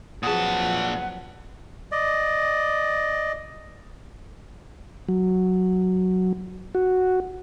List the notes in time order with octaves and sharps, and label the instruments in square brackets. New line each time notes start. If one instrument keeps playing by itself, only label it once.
[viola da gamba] F2 F#3 B4 [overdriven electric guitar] A#2 A5 [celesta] G#4 D#6 [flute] F#5
[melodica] D5 D#5
[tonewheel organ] F#3
F#4